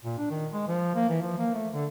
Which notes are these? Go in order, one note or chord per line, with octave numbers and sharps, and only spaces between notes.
A#2
D4
D#3
G#3
F3
A#3
E3
F3
A#3
A3
D3